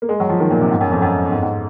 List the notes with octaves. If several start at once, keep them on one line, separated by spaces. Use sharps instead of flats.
A#3
G#3
F#3
F3
D#3
A#2
C3
G#2
F#2
F2
F#2
G#2
G#2